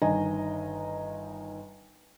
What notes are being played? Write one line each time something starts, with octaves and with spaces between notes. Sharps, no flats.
G1 D#3 D#5 G#5 A#5